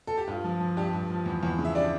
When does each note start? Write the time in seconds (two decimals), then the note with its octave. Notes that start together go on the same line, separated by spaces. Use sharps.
0.07 A4
0.17 G4
0.28 G2 F4
0.44 F3
0.60 F3
0.77 G2 G3 G4
0.93 G2
1.10 F3
1.26 E2
1.43 E2
1.59 C#3
1.65 E5
1.75 G3 D4 D5